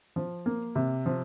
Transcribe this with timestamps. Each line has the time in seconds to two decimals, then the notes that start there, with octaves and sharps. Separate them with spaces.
0.16 F3
0.46 A#3
0.76 C3
1.06 F3